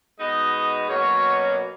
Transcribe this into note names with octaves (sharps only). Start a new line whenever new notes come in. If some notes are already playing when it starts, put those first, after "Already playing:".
B2 G#3 B3 D#4 D#5
B2 F#3 A#3 C#4 C#5